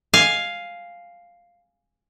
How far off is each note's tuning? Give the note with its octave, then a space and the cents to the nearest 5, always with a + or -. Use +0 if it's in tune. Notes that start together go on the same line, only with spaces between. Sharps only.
F5 +0 G#5 +0